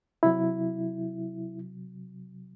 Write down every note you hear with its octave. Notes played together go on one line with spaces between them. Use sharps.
C3 F#3 E4